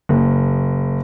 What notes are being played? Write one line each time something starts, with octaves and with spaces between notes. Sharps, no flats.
F#1